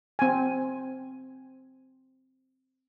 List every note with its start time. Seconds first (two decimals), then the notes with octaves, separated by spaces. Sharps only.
0.19 C4 G#5